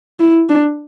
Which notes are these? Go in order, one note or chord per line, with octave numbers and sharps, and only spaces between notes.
E4
D4